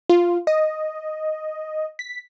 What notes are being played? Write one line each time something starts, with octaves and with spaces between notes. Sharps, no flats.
F4
D#5
B6